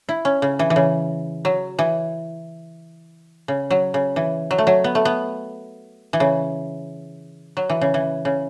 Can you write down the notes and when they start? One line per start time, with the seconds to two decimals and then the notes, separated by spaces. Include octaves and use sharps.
0.09 E4
0.25 C#4
0.42 C#3
0.59 E3
0.70 E3
0.76 C#3
1.45 F#3
1.79 E3
3.48 C#3
3.70 F#3
3.94 C#3
4.16 E3
4.51 F#3
4.58 A3
4.67 F#3
4.84 B3
4.95 A3
5.05 B3
6.13 E3
6.20 C#3
7.57 F#3
7.69 E3
7.81 C#3
7.94 E3
8.25 C#3